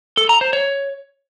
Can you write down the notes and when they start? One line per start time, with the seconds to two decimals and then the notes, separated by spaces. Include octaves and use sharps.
0.17 A4
0.29 A#5
0.41 C5
0.53 C#5